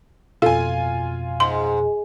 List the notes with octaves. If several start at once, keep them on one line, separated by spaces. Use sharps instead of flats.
F2 B2 F4 A4 G#5
G#2 C6